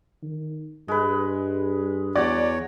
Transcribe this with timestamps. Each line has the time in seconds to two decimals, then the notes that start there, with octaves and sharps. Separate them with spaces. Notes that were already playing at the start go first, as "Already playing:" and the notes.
0.23 D#3
0.88 G2 G#3 B4
2.16 E2 F#4 C#5 D5